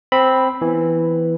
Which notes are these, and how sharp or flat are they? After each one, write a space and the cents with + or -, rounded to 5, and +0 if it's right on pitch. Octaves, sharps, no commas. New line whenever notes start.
C4 +0 B5 +0
E3 +0 B3 +0